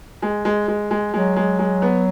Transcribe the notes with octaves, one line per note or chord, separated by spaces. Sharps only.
G#3
G#3
G#3
G#3
F#3 G#3
G#3
G#3
B3